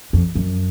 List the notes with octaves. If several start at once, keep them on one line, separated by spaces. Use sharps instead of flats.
F2
F#2